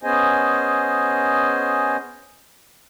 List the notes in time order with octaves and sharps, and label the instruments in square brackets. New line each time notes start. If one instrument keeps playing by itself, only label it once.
[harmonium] B3 C#4 G#4 C5 D#5 G#5